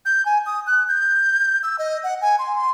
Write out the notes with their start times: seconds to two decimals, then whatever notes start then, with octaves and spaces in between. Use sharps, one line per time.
0.05 G6
0.25 G#5
0.46 D#6
0.67 F#6
0.88 G6
1.63 E6
1.79 D#5
2.04 F#5
2.22 G#5
2.39 C6
2.55 C6